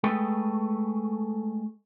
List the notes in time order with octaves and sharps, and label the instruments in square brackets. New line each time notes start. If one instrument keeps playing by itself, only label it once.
[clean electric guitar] G#3 A3 G#4 A4 B4 G5